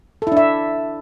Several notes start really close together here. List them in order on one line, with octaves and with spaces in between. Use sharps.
A4 E4 D4 E5